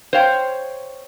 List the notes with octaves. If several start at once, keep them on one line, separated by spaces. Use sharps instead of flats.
C5 C#5 F5 G5